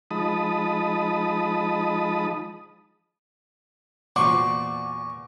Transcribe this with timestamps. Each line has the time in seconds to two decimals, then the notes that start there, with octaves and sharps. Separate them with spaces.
0.11 F3 G#3 D#4 A5 B5 D#6
4.16 E2 A#2 F#4 C5 D5 C#6 D6